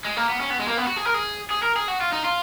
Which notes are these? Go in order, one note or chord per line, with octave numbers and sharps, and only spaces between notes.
G#3
A#3
B3
C#4
B3
G#3
A#3
B3
F#4
G#4
A#4
G#4
G#4
A#4
G#4
F#4
F4
D#4
F4